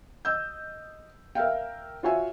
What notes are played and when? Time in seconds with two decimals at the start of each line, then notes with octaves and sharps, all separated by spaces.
0.25 D#5 E6 G6
1.35 A#4 E5 F5 G5
2.03 F4 F#4 C#5 E5 G#5